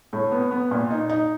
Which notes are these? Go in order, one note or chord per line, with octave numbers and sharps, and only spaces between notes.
A2
B3
B3
A#2
D#4
D#4